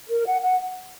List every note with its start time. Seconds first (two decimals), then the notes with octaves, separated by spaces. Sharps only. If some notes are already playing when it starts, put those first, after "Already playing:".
0.09 A#4
0.26 F#5
0.42 F#5